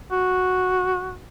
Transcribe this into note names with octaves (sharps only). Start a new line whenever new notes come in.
F#4